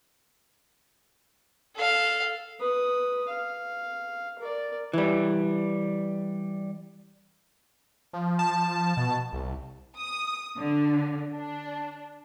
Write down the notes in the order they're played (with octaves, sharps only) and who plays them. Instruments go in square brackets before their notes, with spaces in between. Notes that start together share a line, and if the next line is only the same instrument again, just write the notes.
[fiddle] A4 F5
[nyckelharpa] B4 D#6
F5
A#4 D5
[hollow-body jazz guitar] E3 G3
[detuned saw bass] F3
[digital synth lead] A5
[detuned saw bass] B2
C2
[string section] D#6
D3
D4